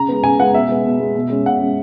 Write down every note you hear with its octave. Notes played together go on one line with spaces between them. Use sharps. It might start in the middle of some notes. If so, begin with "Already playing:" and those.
Already playing: C#3 A#5
G#3 B3
C#3 G#5
G#3 B3 F#5
B2 E5
G#3 B3
B2
G#3 B3
B2
G#3 C#4
B2 F#5
G#3 C#4